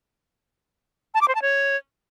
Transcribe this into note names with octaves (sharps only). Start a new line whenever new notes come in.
A5
D6
C5
A5
C#5